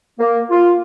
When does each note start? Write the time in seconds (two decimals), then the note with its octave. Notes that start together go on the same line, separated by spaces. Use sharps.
0.19 A#3
0.51 F4